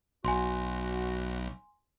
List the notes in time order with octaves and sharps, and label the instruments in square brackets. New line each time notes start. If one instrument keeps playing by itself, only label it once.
[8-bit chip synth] B1 [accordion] F#4 [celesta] G#5 C6